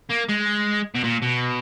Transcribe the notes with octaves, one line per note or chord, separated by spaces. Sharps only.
A#3
G#3
B2
A#2
B2